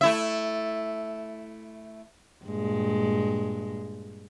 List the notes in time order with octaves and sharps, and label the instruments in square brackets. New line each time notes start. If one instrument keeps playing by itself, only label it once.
[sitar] A3 E4 E5
[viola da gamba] G2 A#2 G#3